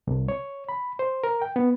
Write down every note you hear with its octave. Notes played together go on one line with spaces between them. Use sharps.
C2
C#5
B5
C5
A#4
G5
B3